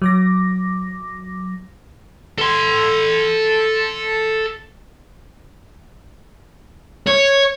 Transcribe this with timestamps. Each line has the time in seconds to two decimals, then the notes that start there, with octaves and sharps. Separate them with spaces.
0.02 F#3 D6 A#6
2.38 A4 C6
7.07 C#5